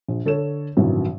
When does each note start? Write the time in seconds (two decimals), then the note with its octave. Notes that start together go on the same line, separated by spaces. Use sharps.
0.08 A#1
0.25 D3 A4 C#5 E7
0.77 A1 G2 C3 D#3 E3 F#3